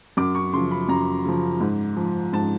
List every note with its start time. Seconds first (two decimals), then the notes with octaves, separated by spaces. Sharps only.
0.17 F#2 D6
0.35 C#6
0.53 C#3 F3 C6
0.71 B5
0.89 F#2 A#5
1.25 C#3 F3
1.60 G#2
1.96 F3
2.33 G#2 A5